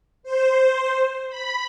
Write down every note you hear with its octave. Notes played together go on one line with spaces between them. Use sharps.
C5
B5